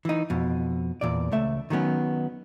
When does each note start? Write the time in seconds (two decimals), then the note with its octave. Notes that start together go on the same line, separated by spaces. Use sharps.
0.05 E3 D#4
0.30 F2 B2
1.01 E2 A#2 D5
1.32 C#2 A3 E5
1.70 D#3 F#3 A3 B3 C#4